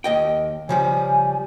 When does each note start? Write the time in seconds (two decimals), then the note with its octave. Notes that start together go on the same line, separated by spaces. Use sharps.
0.04 D#2 D#5 G5
0.69 C#3 F3 G3 G#5